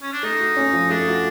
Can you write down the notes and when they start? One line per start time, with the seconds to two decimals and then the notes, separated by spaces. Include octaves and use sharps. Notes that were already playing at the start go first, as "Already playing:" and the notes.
0.02 C#4
0.13 D4
0.23 A3 D#4
0.40 F#4
0.57 C#4
0.73 F3
0.90 A3 D4
1.07 F#4